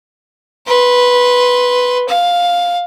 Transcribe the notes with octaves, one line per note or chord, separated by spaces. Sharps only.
B4 C6
F5